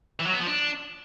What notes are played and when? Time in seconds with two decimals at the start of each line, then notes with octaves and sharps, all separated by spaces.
0.20 E3
0.26 F#3
0.33 B3
0.40 F3
0.47 D4